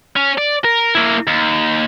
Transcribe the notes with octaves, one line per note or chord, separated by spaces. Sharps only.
C#4
D5
A#4
A#3 E4
D#2